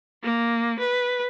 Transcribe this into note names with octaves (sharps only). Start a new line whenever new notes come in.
A#3
B4